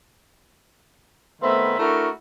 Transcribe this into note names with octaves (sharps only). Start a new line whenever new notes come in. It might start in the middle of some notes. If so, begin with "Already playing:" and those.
D#3 A3 B3 C4 E5 B5
A3 D4 E4 F#4 A#4